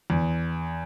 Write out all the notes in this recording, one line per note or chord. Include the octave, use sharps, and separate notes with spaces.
E2